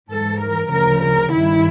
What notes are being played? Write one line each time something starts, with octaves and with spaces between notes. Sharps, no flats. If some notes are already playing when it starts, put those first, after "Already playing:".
G#2 E3 A4
A#4
D2 C#3 F3 A#4
A#4
G2 D#3 E4